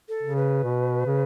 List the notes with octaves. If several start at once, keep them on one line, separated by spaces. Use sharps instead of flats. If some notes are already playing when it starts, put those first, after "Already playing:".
A4
C#3
B4
B2
C#3